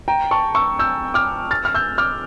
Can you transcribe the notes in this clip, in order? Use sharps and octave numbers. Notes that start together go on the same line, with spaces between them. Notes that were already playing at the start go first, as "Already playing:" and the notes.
G5 A#5
A5 C#6
C#6 E6
E6 G6
D6 F6
F6 A6
F6
E6 G6
D6 F6